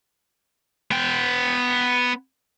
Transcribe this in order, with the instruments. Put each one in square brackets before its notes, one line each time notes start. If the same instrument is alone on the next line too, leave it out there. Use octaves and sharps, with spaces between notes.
[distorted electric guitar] B3 G5